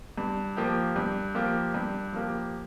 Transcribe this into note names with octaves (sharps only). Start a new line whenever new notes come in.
G2
F3 A#3 G4
G2
F3 A#3 G4
G2
F3 A#3 G4